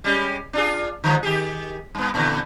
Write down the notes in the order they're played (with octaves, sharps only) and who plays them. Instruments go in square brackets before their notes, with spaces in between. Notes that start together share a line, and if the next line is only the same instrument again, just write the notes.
[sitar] G3 G#3 C#4
D4 F4 G#4
D3 F3 G#3
D#3 G4 G#4
G2 B3
A#2 D3 E3